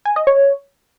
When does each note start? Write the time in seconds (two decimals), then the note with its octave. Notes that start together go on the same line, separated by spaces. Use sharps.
0.05 G#5
0.16 D#5
0.27 C#5